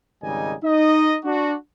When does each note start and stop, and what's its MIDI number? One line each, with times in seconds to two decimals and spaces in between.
0.22 0.54 32
0.22 0.54 49
0.22 0.54 55
0.22 0.54 63
0.22 0.54 75
0.22 0.54 80
0.63 1.17 63
0.63 1.17 75
1.24 1.54 62
1.24 1.54 66